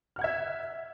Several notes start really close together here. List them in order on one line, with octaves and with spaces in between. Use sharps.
F6 F#5 G#6 E5